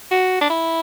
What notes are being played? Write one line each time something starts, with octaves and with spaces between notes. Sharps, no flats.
F#4
D4
E4